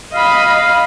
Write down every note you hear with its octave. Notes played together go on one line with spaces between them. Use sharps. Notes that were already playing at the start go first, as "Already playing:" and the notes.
D#5 F5 B5